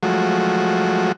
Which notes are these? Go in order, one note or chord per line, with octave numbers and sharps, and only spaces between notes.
F3 F#3 G#3 A3 F#4